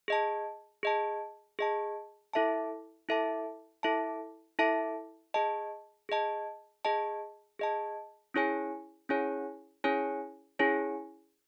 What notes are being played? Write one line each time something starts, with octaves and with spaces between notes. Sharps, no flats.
G#4 D#5 A5
G#4 D#5 A5
G#4 D#5 A5
E4 A4 E5 A5
E4 A4 E5 A5
E4 A4 E5 A5
E4 A4 E5 A5
G#4 D#5 A5
G#4 D#5 A5
G#4 D#5 A5
G#4 D#5 A5
C#4 E4 G#4 C#5 G#5
C#4 E4 G#4 C#5 G#5
C#4 E4 G#4 C#5 G#5
C#4 E4 G#4 C#5 G#5